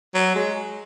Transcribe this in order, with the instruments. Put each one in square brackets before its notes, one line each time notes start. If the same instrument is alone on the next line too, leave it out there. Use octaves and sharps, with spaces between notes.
[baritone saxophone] F#3
G#3